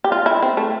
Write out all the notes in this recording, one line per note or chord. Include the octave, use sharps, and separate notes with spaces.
G4
F4
E4
C4
A3